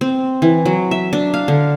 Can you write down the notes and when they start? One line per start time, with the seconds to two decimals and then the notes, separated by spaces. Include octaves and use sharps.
0.01 C4
0.42 E3
0.65 F#3
0.91 E5
1.13 D4
1.34 F5
1.48 D3